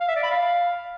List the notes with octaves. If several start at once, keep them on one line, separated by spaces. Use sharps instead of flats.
F5
E5
D5
B5
F5